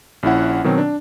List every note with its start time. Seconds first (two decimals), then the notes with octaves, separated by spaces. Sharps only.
0.23 A#1 C#4 E4 F#5
0.64 B2 D#3 F#3 C4
0.78 D4